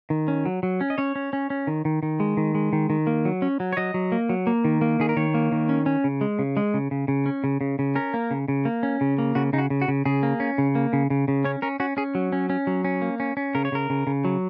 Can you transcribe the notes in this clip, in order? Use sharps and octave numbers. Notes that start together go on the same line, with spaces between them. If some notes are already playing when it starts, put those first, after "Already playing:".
D#3
C#4
F#3
F#3
C#4
D#5
C#4 C#5
C#4
C#4
C#4
D#3
D#3
D#3
G#3
D#3
G#3
D#3
D#3
A#3
F#3
C#4
F#3
C#5
F#3 D#5
F#3
A#3
F#3
A#3
D#3
A#3
D#3 G#4
A#4
D#3 C#5
A#3
D#3
C#4
C#4
C#3
G#3
C#3
G#3
C#3
C#3
C#3
C#4
C#3
C#3
C#3
C#4 A#4
A#3
C#3
C#3
A#3
C#4
C#3
A#3
C#3 F#4
C#3 D#4
F#4
C#3
F#4
C#3
C#3 G#4
A#3
C#4
C#3
A#3
C#3
C#3
C#3
C#4 C#5
C#4 A#4
C#4 F#4
C#4 G#4
F#3
C#4
C#4
F#3
C#4
A#3
C#4
C#4
C#3 A#4
C#5
C#3 A#4
C#3
C#3
F#3